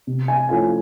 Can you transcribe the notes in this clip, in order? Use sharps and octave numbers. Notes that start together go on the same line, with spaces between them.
C3
G#5
F3 A3 C#4 E4 G#5